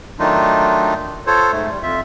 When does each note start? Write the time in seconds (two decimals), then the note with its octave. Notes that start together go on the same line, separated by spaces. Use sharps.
0.19 D#3 F#3 A3 D4 D#4 F4
1.27 F4 A4 C5 C#5
1.52 G#2 A3
1.70 G3
1.83 F2 F4 E5